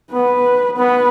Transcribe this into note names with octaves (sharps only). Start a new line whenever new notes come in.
B3 B4
B3 B4